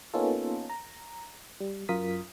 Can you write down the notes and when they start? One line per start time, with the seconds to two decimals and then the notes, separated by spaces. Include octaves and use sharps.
0.14 A#3 B3 C#4 D#4 F4 A4
0.70 A#5
1.60 G3
1.89 F#2 F4 A#4 D#6 B6